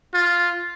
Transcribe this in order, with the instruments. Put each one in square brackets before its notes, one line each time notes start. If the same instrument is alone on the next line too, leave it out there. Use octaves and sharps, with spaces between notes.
[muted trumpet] F4